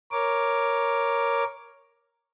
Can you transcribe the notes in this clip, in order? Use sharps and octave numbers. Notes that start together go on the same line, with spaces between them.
A#4 C#5 D6